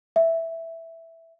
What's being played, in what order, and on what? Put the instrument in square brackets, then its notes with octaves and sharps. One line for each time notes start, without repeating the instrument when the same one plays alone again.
[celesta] E5